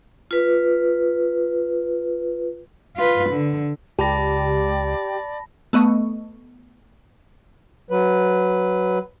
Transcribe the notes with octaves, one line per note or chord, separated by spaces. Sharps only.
F4 B4
F4 B4
D3
C#2 G4 D5 A5 B5 A#6
A3 B3 D#5 C#6
F#3 B4